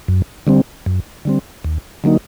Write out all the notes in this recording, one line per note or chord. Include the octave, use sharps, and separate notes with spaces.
F#2
D3 G3 C4
F#2
D3 G3 C4
D#2
D3 F#3 A#3 D#4